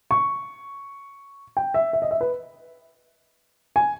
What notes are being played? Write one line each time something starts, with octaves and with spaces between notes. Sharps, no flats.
C#6
G5
E5
E5
D#5
E5
B4
G#5